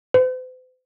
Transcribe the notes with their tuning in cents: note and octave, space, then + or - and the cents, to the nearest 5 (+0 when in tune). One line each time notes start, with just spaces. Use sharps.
C5 -45